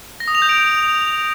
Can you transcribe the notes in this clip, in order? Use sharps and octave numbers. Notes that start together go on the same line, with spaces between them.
A#6
D#6
F7
G6
D7